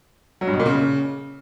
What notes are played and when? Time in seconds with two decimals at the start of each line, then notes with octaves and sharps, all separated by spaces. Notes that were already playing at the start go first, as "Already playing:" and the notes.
0.41 F#3
0.47 G2
0.53 B2
0.60 A#2
0.66 C#3